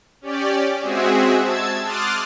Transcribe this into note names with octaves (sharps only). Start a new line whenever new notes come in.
C#4 G4 D5
G#3 C4 F#4 G#4 E5
A5 E6 G#6
C6 D6 D#6 F6 F#6 A6